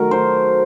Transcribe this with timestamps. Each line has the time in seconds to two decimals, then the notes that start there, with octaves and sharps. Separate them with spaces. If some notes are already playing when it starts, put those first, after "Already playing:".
Already playing: D#3 F#3 A3 A#4
0.11 C5